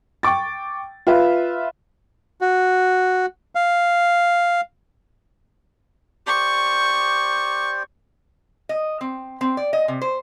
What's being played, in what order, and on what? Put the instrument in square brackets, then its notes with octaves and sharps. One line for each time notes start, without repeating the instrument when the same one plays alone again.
[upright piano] G5 C#6 D6 A6
F4 B4 E5 F5
[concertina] F#4
F5
[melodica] G4 C5 D5 [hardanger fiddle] C#6
[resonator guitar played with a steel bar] D#5
C4
C4
D5
D#5
C3
C5